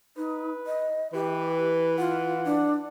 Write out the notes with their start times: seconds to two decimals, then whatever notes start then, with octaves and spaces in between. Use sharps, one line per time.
0.17 D#4 B4
0.66 D#5
1.13 E3 G4 B4
1.98 F4 F#5
2.45 D4